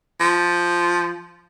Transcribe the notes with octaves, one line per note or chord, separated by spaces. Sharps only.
F3